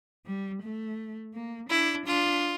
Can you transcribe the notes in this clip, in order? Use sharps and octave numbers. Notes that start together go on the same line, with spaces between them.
G3
A3
A#3
D4 E4
D4 F4